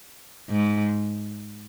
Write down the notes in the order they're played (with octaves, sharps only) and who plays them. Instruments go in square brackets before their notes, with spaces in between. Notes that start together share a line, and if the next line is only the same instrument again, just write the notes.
[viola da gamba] G#2